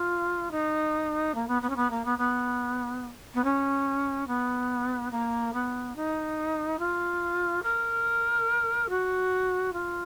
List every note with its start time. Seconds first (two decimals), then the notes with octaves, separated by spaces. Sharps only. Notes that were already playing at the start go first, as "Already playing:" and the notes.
Already playing: F4
0.51 D#4
1.34 A#3
1.47 B3
1.61 B3
1.69 C#4
1.75 B3
1.90 A#3
2.04 B3
2.18 B3
3.34 B3
3.43 C#4
4.27 B3
5.11 A#3
5.53 B3
5.96 D#4
6.79 F4
7.62 A#4
8.89 F#4
9.72 F4